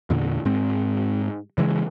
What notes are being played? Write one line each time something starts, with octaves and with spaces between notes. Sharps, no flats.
E2 A#2 D3
G#2 G#3 C4
C#3 E3 G#3